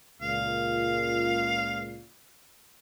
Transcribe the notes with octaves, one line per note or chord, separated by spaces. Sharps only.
C#2 A#2 F5